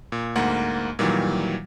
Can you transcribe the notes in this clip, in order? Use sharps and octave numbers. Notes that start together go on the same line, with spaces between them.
A#2
D2 G#2 A#3 F#5
A#2 D#3 E3 F#3 G3